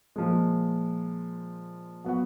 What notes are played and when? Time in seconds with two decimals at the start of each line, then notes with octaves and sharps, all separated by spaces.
0.16 A#2 F3 G#3
2.04 F#3 B3 F#4